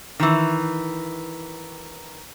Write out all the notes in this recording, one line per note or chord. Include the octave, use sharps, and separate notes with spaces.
D#3 E3